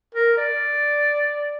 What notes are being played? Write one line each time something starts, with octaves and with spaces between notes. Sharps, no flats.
A#4
D5